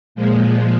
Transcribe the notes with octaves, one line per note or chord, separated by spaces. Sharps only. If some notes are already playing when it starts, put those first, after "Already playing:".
A#2 F3 G#3